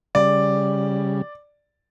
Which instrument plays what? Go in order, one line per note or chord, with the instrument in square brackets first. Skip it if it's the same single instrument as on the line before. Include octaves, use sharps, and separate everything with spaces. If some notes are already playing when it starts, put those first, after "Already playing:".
[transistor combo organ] C#3 G3 [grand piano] D5